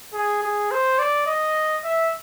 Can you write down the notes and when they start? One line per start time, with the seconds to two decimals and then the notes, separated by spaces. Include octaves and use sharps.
0.13 G#4
0.43 G#4
0.71 C5
0.99 D5
1.26 D#5
1.84 E5